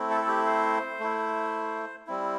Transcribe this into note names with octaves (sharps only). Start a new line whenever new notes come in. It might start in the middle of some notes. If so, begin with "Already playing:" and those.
Already playing: A3 C4 E4
A4
A4
G4
C5
A3 E4
G3 C4 E4